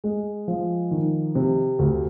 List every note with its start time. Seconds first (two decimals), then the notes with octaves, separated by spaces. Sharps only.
0.04 G#3
0.48 F3
0.91 D#3
1.35 C3
1.79 D2